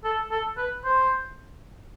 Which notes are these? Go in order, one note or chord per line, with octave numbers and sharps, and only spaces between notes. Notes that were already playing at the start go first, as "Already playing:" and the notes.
A4
A4
B4
C5